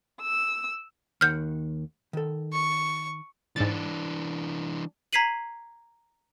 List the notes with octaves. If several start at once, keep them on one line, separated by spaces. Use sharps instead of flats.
E6
D#2 D#3 F#5 F6 G6
D#3 A4
C#6
G#2 E3 D4 A6
A#5 G#6 B6 C7 D#7 F#7